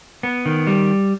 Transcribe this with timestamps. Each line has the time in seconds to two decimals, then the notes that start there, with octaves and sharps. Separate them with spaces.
0.23 B3
0.46 D#3
0.67 G3